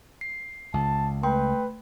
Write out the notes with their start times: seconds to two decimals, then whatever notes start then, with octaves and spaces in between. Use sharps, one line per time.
0.21 C7
0.74 C#2 A5
1.23 A3 B4 G5 C6